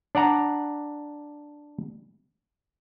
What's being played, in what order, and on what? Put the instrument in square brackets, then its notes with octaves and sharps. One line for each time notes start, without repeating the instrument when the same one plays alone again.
[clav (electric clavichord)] D4 D5 F#5 A#5